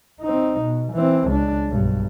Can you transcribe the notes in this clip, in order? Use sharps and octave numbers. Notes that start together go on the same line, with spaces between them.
C4 D#4
B2
E3 C4
C#2 D4
B1 G2